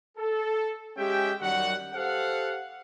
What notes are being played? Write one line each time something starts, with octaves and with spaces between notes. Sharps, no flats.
A4
G#3 C#4 G4 E5 G5
F#2 D#3 G3 F#4 F#5
G4 A4 C5 F5 F#5